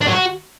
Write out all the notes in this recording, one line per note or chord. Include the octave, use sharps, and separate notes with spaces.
D4
F#3
F#4